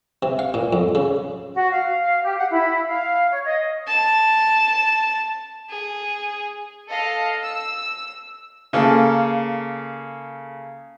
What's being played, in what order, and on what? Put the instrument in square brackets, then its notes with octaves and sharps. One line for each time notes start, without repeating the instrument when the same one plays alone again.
[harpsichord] C3
F5
A#2
F2
C#3
[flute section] F#4
F5
G4
F#5
E4
F5
C#5
D#5
[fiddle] A5
G#4
[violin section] A4 D#5 F5
E6
[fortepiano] C#3 A#3 A4